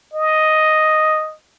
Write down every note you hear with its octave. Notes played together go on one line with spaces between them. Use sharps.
D#5